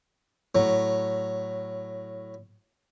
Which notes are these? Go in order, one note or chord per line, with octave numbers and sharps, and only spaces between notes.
A2 F#3